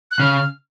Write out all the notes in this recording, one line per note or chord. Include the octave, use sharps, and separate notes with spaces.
F#6
C#3 F6